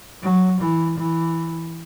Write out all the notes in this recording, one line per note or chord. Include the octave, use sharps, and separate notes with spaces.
F#3
E3
E3